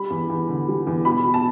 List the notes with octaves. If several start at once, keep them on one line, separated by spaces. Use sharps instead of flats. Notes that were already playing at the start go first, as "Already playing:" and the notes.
Already playing: G3 B5
E2
E2
D3
G3
E2
B2 B5
B2
A5